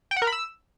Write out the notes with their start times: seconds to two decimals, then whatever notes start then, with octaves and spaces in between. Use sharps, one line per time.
0.11 G5
0.16 F#5
0.22 A#4
0.27 B5
0.32 E6